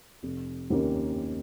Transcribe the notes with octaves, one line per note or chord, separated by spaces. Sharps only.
F1
D#2 D#3 A#3 C#4